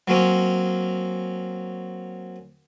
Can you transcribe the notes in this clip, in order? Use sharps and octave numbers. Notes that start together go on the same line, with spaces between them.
F#3 A#3 C4 C#4